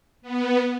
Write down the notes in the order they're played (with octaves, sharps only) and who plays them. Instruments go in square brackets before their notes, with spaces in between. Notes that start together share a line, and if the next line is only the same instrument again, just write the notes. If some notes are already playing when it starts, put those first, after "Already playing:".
[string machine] B3